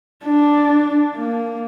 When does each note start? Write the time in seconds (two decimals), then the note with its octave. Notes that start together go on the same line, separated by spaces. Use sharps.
0.25 D4
1.15 A#3